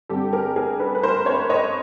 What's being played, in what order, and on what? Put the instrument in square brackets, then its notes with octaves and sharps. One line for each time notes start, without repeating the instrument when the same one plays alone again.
[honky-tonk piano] G2 D3 G3 C4 G4 A4
G#4 A#4
G#4 A#4
A4 B4
B4
A#4 C5
B4 C#5
C#5 D#5